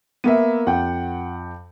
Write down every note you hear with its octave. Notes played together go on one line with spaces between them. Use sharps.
A#3 B3 E5 D#7
F2 F#5 G5